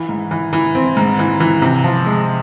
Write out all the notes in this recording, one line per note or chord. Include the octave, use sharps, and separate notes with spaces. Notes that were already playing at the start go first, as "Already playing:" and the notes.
Already playing: E3
G#2
E3
E3
C4
G#2
E3
E3
C3
F3
G#3